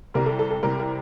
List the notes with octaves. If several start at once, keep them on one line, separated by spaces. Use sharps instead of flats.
C2 C3 G3 A#4
A4
A4
A4
C2 C3 G3 A#4
A#4